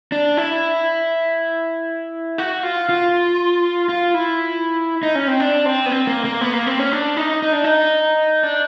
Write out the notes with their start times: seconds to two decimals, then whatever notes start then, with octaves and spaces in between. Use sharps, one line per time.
0.12 D4
0.37 E4
2.38 F#4
2.63 F4
2.89 F4
3.89 F4
4.14 E4
5.03 D#4
5.15 C#4
5.28 C4
5.40 D4
5.66 C4
5.86 B3
5.92 C4
6.07 A#3
6.25 A#3
6.41 B3
6.53 A#3
6.67 C4
6.79 C#4
6.92 D4
7.17 D#4
7.42 D#4
7.52 D4
7.64 D#4
8.43 D4